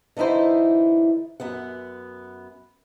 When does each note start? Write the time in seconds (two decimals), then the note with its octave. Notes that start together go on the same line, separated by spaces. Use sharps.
0.17 D3 E3 D#4 E4 C5
1.40 F#2 B3 F#5